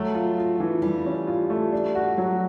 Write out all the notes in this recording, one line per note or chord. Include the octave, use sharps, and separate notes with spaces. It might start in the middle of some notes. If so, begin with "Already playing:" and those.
Already playing: F#3 A3
F4
F4
E3
E3 G3
C#4
F4
A3
D4
F#4
F#3